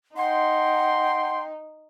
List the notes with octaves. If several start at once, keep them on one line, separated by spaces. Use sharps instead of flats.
D#4 F#5 G5 C6